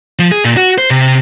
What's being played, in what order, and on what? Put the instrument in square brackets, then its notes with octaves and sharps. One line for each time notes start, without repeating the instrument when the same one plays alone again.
[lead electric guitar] F3
G#4
A#2
F#4
C5
C3